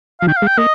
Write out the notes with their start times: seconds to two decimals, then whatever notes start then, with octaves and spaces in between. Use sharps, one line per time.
0.21 F3 F5
0.27 D#3 G5
0.37 F5
0.42 G#3
0.47 G5
0.58 A#3 D#5